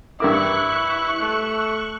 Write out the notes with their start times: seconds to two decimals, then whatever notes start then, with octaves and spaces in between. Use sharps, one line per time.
0.20 G2 E4 A#4 C#6 D6 F#6
1.20 A3